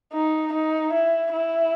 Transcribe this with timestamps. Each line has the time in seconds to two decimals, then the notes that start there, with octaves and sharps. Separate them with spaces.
0.13 D#4
0.53 D#4
0.93 E4
1.33 E4